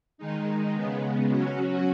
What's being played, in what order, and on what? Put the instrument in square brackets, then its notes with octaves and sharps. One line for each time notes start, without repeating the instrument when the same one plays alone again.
[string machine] D#3 G#3 D#4
C#3 G#3 B3
F#3 C#4 F#4